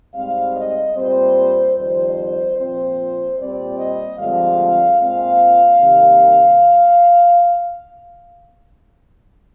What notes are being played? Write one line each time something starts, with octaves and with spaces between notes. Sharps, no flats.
G#2 G3 C4 F5
D#5
A#2 G3 C4 C5
F2 D#3 G3 C4 C5
A#2 F3 C4 C5
A#2 G3 C4 D5
D#5
G2 D3 F3 G#3 C4 F5
A#2 G#3 C4 F5
C3 D#3 G3 A#3